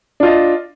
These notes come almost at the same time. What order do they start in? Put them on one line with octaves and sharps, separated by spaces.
D4 F4 D#5